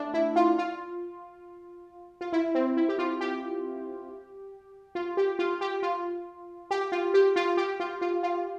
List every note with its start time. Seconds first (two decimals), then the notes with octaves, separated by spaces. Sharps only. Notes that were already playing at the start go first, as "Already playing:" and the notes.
Already playing: A3 D4
0.14 E4
0.36 F4
0.58 F4
2.21 F4
2.33 E4
2.55 C4
2.77 E4
2.89 G4
2.99 F4
3.21 G4
4.95 F4
5.17 G4
5.39 F4
5.61 G4
5.83 F4
6.71 G4
6.92 F4
7.14 G4
7.36 F4
7.57 G4
7.80 F4
8.01 F4
8.23 F4